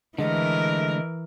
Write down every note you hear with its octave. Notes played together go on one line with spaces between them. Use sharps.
D3 E3 G#3 A3 A#4 D#5